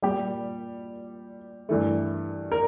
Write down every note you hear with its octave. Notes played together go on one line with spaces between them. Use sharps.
A#2 G3 G4
G2 E3 A3
A#4